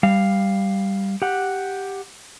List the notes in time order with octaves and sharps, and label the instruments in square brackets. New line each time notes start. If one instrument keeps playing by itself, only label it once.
[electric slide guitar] G3 F5
G4 F#5